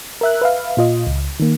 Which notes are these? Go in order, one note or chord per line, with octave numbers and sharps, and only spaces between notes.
A#4 E5 F#6
B4 E5 F5
A#2 F4 D#5
C#2
D#3 A#3